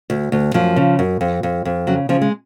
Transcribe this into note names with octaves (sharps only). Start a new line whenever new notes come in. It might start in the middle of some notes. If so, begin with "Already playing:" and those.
D2
D2
F#2 F3
C#3
F#2
F2
F2
F2
C#3 F#3
C#3 F3
G#3